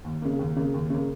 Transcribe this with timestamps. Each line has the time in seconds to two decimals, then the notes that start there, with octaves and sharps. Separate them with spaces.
0.04 D#2
0.22 C#3 A#3
0.39 D#2
0.56 C#3 A#3
0.74 D#2
0.90 C#3 A#3